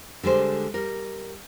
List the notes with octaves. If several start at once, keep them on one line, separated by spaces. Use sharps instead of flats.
D3 G3 G#3 C5
G3 A#4